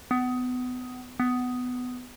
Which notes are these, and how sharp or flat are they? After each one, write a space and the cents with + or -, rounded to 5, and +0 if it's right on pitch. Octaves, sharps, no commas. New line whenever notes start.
B3 +25
B3 +15